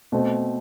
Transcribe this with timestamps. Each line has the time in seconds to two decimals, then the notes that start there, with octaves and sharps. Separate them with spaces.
0.12 B2 A3 C4